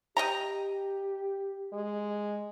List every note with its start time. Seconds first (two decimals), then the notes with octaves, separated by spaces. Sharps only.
0.17 G4 D#5 G5 A#5
1.73 G#3